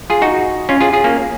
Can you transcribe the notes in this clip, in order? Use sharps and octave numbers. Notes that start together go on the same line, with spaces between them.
F4 G#4
D#4 F#4
C#4 F4
F4 G#4
F4 G#4
A#3 C#4